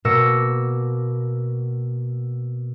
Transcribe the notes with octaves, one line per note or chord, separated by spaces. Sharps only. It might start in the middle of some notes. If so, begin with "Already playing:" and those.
B2 A#3 D6 E6 A#6 C#7